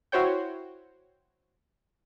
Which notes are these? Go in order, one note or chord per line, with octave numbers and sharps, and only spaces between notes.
E4 F#4 C5 C#5 G5